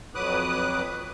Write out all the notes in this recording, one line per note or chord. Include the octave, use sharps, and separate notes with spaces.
F2 F#3 B4 D6 D#6 F#6